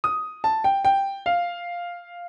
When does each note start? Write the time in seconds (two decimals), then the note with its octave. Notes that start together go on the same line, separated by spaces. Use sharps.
0.04 D#6
0.44 A5
0.64 G5
0.85 G5
1.26 F5